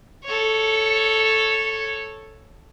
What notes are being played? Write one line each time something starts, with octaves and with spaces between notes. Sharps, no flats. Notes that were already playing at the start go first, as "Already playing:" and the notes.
A4 C#5